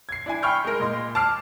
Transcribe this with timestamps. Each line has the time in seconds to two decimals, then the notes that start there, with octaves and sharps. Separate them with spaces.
0.09 G#6 C7
0.26 D4 E4 G#5
0.43 G5 B5 C#6 F6 G6
0.65 G#3 A#4
0.80 A#2 D#5 C6
1.15 A5 D6 F6 C7